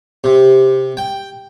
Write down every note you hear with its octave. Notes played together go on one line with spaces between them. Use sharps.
C3
G5